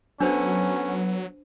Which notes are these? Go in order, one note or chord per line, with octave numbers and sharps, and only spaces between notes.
F#3 B3 C#4 D4 A4 C5 D5